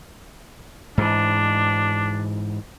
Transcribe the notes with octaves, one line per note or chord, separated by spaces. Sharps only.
G#2 E3 D4